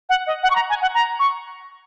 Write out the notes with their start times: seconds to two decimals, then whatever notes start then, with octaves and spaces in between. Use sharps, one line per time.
0.09 F#5
0.27 D#5
0.43 F#5
0.50 C#6
0.56 A#5
0.69 G#5
0.82 F#5
0.94 A#5
1.19 C#6